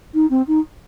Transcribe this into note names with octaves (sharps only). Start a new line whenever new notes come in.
D#4
C4
D#4